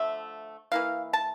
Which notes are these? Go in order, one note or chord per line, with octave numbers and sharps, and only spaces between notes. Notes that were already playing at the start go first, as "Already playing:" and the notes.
Already playing: D3 F3 A3 E5
E3 A#3 E4 F5
A5